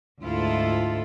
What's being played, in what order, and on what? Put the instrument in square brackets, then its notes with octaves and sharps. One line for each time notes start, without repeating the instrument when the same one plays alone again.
[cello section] D2 G#2 E4 F4 A4